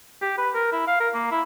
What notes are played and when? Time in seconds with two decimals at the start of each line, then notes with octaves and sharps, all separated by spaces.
0.21 G4
0.38 B4
0.54 A#4
0.72 E4
0.87 F5
1.00 A#4
1.14 A#3
1.31 E4